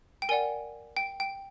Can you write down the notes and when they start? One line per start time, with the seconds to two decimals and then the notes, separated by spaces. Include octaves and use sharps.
0.22 G5
0.29 A#4 D5 F#5 G#5
0.97 G5
1.20 G5